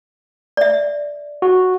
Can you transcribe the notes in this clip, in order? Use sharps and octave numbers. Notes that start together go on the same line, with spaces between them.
D5 E5
F#4